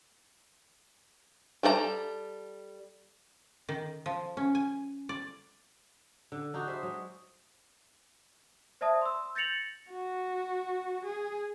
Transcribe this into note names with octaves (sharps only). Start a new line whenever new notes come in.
G3 A4 B4 A#5
D#3
F3
C#4
G#5
D5
D3
D4 D#4 F#4
G#4 C5 E5
F#3 G#3
C5 D5 E5 A5 D#6
C6 E6
G6 A6 A#6 C#7 F7 F#7
F#4
G#4